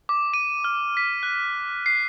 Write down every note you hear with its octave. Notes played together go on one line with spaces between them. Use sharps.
D6
D#7
F6
B6
F#6
C7